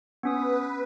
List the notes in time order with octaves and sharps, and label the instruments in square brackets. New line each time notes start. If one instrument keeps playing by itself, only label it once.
[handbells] B3 C#4 D#6 [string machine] B4